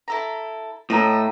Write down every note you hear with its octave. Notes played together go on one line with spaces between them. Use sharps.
E4 A4 A#5
A2 D#5 E5 A#5